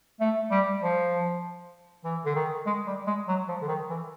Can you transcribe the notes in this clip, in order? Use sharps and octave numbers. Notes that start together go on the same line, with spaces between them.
A3
G3
F3
E3
D3
D#3
G#3
G3
G#3
F#3
F3
D3
D#3
E3